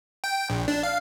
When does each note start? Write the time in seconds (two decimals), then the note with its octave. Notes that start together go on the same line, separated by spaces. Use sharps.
0.24 G5
0.50 A#1
0.68 D4
0.83 F5